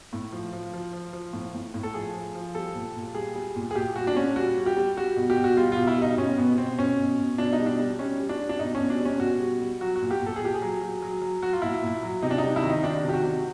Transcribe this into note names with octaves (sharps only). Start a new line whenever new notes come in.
A2
F3
F3
F3
F3
F3
A2
A2
A2
A4
F3 G#4
F3
F3
G3 A4
A#2
A#2
G3 G#4
G3
A#2
G#4
A#2 G4
G3 F#4
D4
A#2 C#4
G3 F#4
G3
G4
G3
G3 F#4
B2
G4
B2
F#4
G3 F4
B2 F4
E4
G3 D#4
B2 C#4
B2 B3
B2 C4
B2 C#4
B2
B2
B2 D4
D#4
G3
D4
G3
G3 C#4
G3
D4
G3
D4
B2 D#4
C#4
B2
D4
G3
C#4
B2 F#4
G3
G3
F#3 F#4
F#4
A#2
G4
A#2
A4
G#4
A#2 G4
G#4
F#3
F#3
F#3
F#3
F#3 F#4
F4
A#2 E4
A#2
F#3
C3 D#4
D4
D#4
G3
E4
D#3
D#4
D#3 D4
C3
G4
F#4
C3